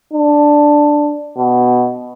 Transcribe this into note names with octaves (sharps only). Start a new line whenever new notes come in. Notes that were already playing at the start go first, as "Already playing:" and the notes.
D4
B2